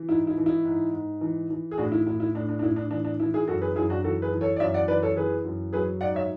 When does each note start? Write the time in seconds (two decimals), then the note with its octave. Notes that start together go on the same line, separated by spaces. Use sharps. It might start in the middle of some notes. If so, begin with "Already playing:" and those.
Already playing: E3
0.09 G#2 E4
0.27 E4
0.38 E3
0.46 E4
0.65 G#2
0.93 G#2
1.21 E3
1.50 E3
1.71 G#4
1.78 A2 D4 F#4
1.92 E4
2.06 A2 E4
2.20 E4
2.35 A2 D4
2.49 D4
2.59 D4
2.62 A2 E4
2.76 D4
2.91 E3 D4
3.05 D4
3.20 E3 E4
3.34 E4 G#4
3.48 F#2 F#4 A4
3.62 G#4 B4
3.76 F#2 E4 G#4
3.90 D4 F#4
4.04 E3 F#4 A4
4.22 G#4 B4
4.32 E3
4.41 A4 C#5
4.56 D5
4.60 F#2 C#5 E5
4.74 D5 F#5
4.88 E3 B4 D5
5.02 A4 C#5
5.17 E3 G#4 B4
5.44 F#2
5.73 F#3 G#4 B4
6.01 G#2 D5 F#5
6.15 C#5 E5